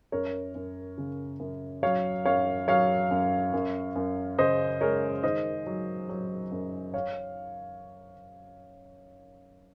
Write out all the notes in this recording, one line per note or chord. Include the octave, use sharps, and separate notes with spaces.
F#2 A#4 C#5
F#2
C#3
F#2
F#3 C#5 F5
F#2 C#5 F5
F#3 C#5 F5
F#2
F#2
F#2
C#3 C5 D#5
G#3 A#4 C#5
D#3 C5 D#5
F#3
F#3
F#2
C#5 F5